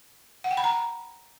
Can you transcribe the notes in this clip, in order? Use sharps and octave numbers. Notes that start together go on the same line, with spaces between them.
F#5
G5
B5
A#5